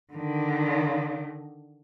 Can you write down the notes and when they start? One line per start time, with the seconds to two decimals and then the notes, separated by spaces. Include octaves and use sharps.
0.13 D3 D#3